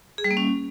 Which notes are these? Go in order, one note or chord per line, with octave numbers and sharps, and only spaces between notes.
G#4
G3
A#3
C#4